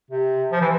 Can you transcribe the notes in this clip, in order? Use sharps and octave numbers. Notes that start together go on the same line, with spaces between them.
C3
F3
E3